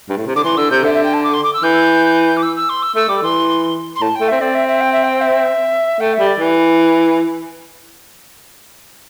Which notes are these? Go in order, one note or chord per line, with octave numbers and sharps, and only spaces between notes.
G2
A2
C3
D3 D6
E3 C6
D3 E6
C3 G6
D3 E5
E5
G5
A5
D6
C6
D6
E6
E3 G6
D6
E6
E6
C6
E6
A3 E6
G3 D6
E3 C6
C6
A2 A5
G5
A3
C4 E5
C4 D5
E5
E5
G5
E5
G5
E5
A3 G5
E5
G3
D5
E3